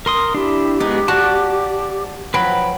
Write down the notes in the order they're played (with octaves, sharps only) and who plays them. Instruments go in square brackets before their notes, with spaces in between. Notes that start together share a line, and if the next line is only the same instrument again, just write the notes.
[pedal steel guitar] A#4 C6 D#6
[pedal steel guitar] D4 E4 [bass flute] G4
[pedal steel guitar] G#3 B3 [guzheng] D#4
[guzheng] F#4 [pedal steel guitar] D5 A5
[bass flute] F3 [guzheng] F#3 [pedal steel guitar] B4 G5 B5